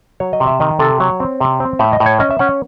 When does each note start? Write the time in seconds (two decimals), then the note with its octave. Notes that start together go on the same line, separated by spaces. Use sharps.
0.20 F#3 C#5
0.33 D#5
0.40 C3
0.47 E5
0.60 D#3 D#5
0.79 C3 A4
1.00 F#3 C#5
1.20 C4
1.40 C3
1.60 C4
1.79 A2 E5
1.93 D#5
2.00 A2
2.06 C#5
2.20 C#4 D#5
2.31 E5
2.39 C#4 F#5